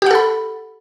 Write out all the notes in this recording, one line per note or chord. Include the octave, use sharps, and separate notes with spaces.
G4 A4 F#5 B5